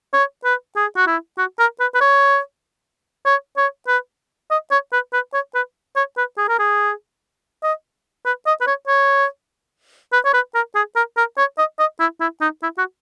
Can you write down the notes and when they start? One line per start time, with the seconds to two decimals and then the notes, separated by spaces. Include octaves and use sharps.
0.14 C#5
0.45 B4
0.76 G#4
0.97 F#4
1.07 E4
1.38 F#4
1.59 A#4
1.80 B4
1.94 B4
2.01 C#5
3.26 C#5
3.57 C#5
3.88 B4
4.51 D#5
4.71 C#5
4.93 B4
5.13 B4
5.33 C#5
5.55 B4
5.96 C#5
6.17 B4
6.38 G#4
6.48 A#4
6.59 G#4
7.63 D#5
8.26 B4
8.46 D#5
8.61 B4
8.67 C#5
8.88 C#5
10.13 B4
10.25 C#5
10.34 B4
10.55 A#4
10.75 G#4
10.96 A#4
11.17 A#4
11.38 C#5
11.58 D#5
11.79 D#5
12.00 E4
12.20 E4
12.41 D#4
12.63 E4
12.78 F#4